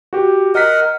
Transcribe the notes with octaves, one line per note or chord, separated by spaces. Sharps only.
F#4 G4
A#4 D#5 F#5 B6